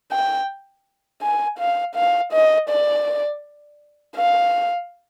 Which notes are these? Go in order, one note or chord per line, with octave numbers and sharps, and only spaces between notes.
G5
G#5
F5
F5
D#5
D5
F5